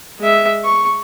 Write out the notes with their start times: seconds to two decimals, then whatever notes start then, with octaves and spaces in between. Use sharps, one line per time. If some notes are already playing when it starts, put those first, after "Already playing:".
0.19 G#3 E5
0.64 C#6